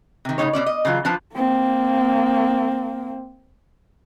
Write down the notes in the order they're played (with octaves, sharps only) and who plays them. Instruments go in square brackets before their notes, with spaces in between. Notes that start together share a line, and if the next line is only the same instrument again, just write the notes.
[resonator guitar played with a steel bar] C3 D#3
A2 C#3 G#3 D#4 C#5
B2 A3 C#4 D5
D#5
C#3 E3 F#3 F4
F3 D4 F4 B4 A5
[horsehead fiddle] A#3 C4